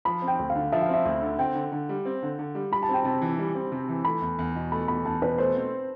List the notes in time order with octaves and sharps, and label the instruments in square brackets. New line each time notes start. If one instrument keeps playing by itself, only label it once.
[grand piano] F3 [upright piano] B5
[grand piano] C4
[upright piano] G5
[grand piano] D2
[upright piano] F5
[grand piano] D3
[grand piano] F3 [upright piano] E5
[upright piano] F5
[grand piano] C4 [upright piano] E5
[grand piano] D2
D3
[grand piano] C4 [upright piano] G5
[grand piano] D3
D3
G3
C4
D3
D3
G3
[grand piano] G3 [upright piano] B5
[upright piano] A5
[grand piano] C4 [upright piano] G5
[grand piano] C3 [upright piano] A5
[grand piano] E3
G3
C4
C3
E3
[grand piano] A3 [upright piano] B5
[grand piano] E2
E2
B2
[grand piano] A3 [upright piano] B5
[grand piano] E2 [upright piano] B5
[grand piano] E2 [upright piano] A5
[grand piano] B2 [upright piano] B4
[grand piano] A3 [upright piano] C5
[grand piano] C4